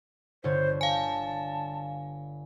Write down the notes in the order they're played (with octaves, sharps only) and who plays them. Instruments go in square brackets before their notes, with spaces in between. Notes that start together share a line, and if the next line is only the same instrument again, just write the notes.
[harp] G1 D3 C#5 [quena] C5
[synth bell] F5 G#5 [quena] A5